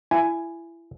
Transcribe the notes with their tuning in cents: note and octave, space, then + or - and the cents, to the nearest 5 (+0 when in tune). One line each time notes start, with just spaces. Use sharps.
E4 +25 G#5 +0